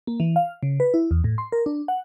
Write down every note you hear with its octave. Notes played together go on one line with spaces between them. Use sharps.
A#3
E3
F5
C#3
B4
E4
E2
A2
C6
A#4
D4
F#5